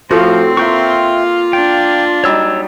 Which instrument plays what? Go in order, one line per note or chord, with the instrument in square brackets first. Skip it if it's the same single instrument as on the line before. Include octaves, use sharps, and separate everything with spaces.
[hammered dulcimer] A2 A3 F4 [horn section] F3 [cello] C4 [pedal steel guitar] F#4
[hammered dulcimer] A#3 [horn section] F4 [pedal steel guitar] E5 G5 C#6
[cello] D4 [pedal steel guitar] G5
[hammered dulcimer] F#3 G3 D#4 [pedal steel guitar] C#5 E6